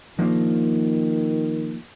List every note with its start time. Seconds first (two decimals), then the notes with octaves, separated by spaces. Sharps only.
0.19 D#3 F3 A#3